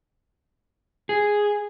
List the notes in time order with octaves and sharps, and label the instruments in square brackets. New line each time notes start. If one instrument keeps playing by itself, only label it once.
[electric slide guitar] G#4